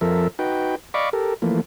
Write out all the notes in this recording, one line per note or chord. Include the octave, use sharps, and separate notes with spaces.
F2 F3 A4 A#4 E5
D#4 F#4 B4 G5
D5 D#5 F5 B5 C#6 D6
G4 A4 A#4
E3 F3 A3 A#3